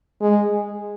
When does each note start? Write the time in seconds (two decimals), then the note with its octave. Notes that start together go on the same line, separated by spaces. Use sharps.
0.21 G#3